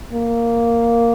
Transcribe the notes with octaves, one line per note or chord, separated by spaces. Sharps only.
A#3